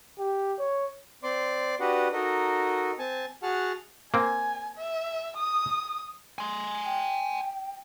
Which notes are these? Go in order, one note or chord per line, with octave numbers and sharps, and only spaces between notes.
G4
C#5
C4 D5 C6 D6
D4 F#4 G4 B4 D#5 F#5
D#4 F#4 A4 A#4 D#5
C4 G#5 A5
F#4 G#4 F#5 A5 F6
A#3 C4 G#5
E5
D#6
G#5 C6
G5